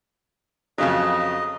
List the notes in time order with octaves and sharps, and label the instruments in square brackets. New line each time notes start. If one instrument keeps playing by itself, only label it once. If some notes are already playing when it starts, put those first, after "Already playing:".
[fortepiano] F2 C#3 F#3 [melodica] D#5